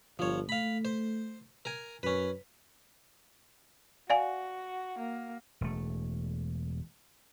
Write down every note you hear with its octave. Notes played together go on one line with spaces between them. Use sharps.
G1 F3 C#5
A3 F5 B5
C5
A#4 G#5
F#2 C#4 B4
F#4 D5 F5 G#5
A#3
E1 A3